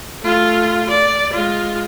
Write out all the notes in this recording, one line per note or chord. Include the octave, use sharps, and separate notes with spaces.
A3 F4
D5
G#3 F4